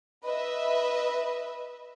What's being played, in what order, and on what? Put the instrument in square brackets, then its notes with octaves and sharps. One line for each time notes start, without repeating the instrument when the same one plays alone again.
[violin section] B4 D#5 E5